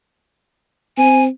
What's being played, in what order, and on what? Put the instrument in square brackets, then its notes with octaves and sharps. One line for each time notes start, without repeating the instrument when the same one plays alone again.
[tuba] C4 [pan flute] G#5